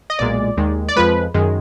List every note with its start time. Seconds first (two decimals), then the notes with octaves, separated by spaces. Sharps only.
0.10 D#5
0.19 B1 A#2 G#3 D5
0.57 D#2 D#3 G#3
0.88 D5
0.96 F2 F3 G#3 B4
1.34 F#2 D#3 G#3